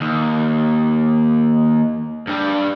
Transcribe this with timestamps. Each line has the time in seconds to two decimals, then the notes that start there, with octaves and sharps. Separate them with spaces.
0.01 D#2
2.27 G2 G3